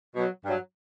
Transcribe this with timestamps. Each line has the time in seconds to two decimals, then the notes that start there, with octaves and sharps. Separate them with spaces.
0.14 B2 F#3
0.44 G2 F#3